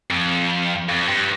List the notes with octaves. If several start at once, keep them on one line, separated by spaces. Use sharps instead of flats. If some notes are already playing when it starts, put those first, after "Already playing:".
F2
F2
G2